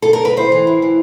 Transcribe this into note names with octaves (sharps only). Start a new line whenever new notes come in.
A4
A#4
B4
A2 C5
E3
A2
E3